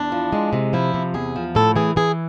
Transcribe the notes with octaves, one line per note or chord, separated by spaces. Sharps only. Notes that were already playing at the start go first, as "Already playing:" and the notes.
Already playing: E2 D4
F3
G#3
C3
F3 E4
C3
E2 G#4
F3
A2 A4
E3 G#4
E3 G#4